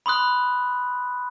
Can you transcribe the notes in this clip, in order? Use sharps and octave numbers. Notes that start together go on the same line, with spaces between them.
B5 C6 D#6 F#6